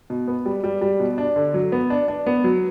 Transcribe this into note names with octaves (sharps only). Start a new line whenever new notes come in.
B2
B3
G3
G3
G3
B2
D4
D3
F#3
B3
D4
D4
B3
F#3